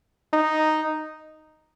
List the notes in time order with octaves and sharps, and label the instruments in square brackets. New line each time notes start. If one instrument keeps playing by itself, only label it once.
[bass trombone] D#4